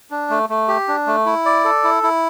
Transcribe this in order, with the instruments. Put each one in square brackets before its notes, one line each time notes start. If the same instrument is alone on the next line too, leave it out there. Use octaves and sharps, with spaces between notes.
[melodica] D4
A3
A3
G4
D4
A3
E4
D5
A4
E4
E4